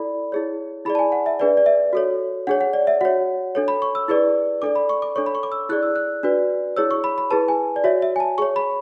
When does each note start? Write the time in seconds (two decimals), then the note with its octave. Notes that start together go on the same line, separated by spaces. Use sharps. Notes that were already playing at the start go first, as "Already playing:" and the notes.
Already playing: E4 A4 D5 B5
0.32 E4 G#4 C#5
0.85 E4 G#4 D5 B5
0.95 A5
0.99 G#5
1.12 F#5
1.26 E5
1.40 D4 G#4 B4 D5
1.57 D5
1.66 E5
1.93 F#4 A4 C#5
2.47 D4 G#4 C#5 F#5
2.61 F#5
2.73 D5
2.87 E5
3.01 F#4 C#5 F#5
3.55 D4 A4 C#5
3.68 B5
3.82 C#6
3.95 E6
4.08 E4 G#4 B4 D5
4.62 D4 A4 D5 D6
4.76 B5
4.89 C#6
5.02 D6
5.16 D4 A4 C#5 C#6
5.26 B5
5.35 C#6
5.43 D6
5.52 E6
5.69 E4 G#4 D5 F#6
5.83 E6
5.96 F#6
6.23 D4 F#4 B4 D5
6.77 E4 G#4 C#5 E6
6.91 C#6
7.04 B5
7.18 B5
7.31 E4 G#4 B4 A5
7.48 G#5
7.76 D5
7.84 F#4 C#5 E5
8.02 E5
8.16 G#5
8.20 A5
8.38 G#4 C#5 C#6
8.56 B5